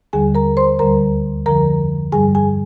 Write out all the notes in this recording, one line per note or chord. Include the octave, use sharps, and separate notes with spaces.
D#2 D3 G3 G#4 G#5
A#4 A#5
C5 C6
D2 D3 G3 A#4 A#5
F2 D3 F3 A#4 A#5
G2 D3 G3 G#4 G#5
G#4 G#5